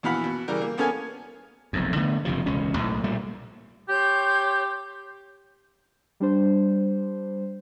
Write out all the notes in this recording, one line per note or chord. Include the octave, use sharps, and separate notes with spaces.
A#1 B2 E3 F5 F#5 B5
B2
C#3 E3 G3 A#4
A#3
A#3 B3 C#4 A4 F5 G#5
F1 B1 F2
D3 A3 B3
F#1 C3 F3
E1 C#2 B2 C#4
B1 A2
A#2 G3 A3 A#3
G4 C#5 C6 G6
G3 D4 C5